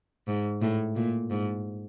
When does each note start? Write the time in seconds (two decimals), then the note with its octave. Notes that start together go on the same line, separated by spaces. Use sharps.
0.28 G#2
0.62 A2
0.96 A#2
1.31 G#2